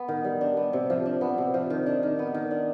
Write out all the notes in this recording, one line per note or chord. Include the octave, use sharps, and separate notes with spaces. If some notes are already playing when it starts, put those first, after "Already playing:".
Already playing: B3
D#3
G3
D4
B3
C3
F3
D4
B3
C3
F3
D#3
D4
D#3
B3
D#3
D4